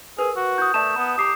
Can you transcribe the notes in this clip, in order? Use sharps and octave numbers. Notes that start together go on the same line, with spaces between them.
G#4 A#4 B4
F#4
E4 D#6 G6
A3 D5 E5 A5 E7
B3 A#5
G4 A#5 D6 D#6 C7